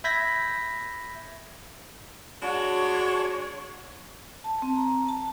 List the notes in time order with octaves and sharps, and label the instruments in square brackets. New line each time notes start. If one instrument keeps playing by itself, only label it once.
[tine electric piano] E5 B5 G6 G#6 A#6 B6
[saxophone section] G#3 D4 F#4 [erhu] C#5
[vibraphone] A5
C4
A#5
A5